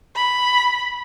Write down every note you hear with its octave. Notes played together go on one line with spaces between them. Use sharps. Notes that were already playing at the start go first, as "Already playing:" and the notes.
B5